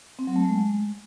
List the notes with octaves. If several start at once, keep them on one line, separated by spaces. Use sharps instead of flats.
C4
F#3
A3
G#3